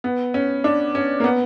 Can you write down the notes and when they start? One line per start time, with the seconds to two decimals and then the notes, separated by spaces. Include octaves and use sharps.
0.04 B3
0.34 C#4
0.64 D4
0.95 C#4
1.20 A#3
1.24 B3